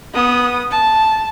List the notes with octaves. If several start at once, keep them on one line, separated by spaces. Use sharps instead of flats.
B3 D#6
A5